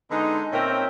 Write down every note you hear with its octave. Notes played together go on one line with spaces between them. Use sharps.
D3 G#3 B3 D#4
A#2 C4 C#4 A#4 E5 G5